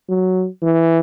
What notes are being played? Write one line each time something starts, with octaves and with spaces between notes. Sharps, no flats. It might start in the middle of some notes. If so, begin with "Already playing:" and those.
F#3
E3